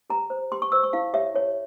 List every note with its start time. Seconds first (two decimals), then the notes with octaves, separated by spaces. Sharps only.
0.10 G4 A#5
0.30 C5
0.52 G4 C6
0.62 C#6
0.72 C5 E6
0.83 C#6
0.93 E4 F5
1.14 G4 C#5 E5
1.34 E4 C#5